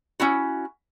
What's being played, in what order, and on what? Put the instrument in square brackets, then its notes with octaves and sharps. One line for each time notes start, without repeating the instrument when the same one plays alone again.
[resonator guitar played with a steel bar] C#4 E4 F#4